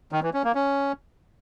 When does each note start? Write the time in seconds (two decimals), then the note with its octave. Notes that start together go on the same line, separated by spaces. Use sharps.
0.12 D#3
0.23 E3
0.34 C#4
0.44 A#3
0.55 C#4